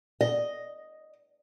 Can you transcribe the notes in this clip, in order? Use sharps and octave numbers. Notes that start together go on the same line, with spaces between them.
D#5